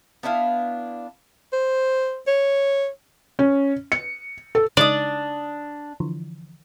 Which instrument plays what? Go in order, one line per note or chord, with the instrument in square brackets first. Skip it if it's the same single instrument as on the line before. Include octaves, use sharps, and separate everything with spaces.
[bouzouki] B3 D4 E4 F5
[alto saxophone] C5
C#5
[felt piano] C#4
C#7
A4
[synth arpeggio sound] C#3 G#3 D#4 [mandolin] D4 D#6 [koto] D5
[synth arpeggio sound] D3 E3 F3